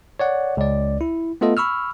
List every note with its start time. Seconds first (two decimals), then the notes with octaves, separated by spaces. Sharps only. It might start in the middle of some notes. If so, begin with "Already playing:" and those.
0.20 C#5 D5 F#5
0.57 C#2 D5
1.01 E4
1.41 A3 B3 F4 A4 D#5
1.57 B5 C#6 E6 F6